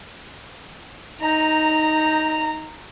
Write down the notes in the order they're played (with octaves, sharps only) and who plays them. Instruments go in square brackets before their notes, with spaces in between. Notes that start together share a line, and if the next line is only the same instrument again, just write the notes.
[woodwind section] D#4 [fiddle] A#5